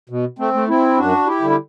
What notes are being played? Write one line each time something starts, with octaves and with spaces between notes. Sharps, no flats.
B2
A3 C4
A3
C4 E4
F#2 D4 F#4
E4 G4
D3 G3
G4